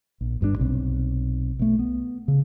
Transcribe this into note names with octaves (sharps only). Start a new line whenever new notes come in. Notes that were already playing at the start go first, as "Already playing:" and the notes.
A#1
G1 G2 D3 D4
B1 C3
B1 A3
B3
C#3